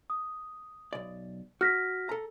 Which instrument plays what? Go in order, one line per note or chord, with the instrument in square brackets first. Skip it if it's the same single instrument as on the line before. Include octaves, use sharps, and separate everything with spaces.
[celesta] D#6
[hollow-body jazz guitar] B1 D5
[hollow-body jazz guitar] F#4 [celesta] F6 A#6 B6
[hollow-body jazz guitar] A4 A#5